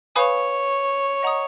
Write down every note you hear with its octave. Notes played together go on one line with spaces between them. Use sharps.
B4 C#5 F5 G#5 B5 D#6
D#5 F#5 A#5 D#6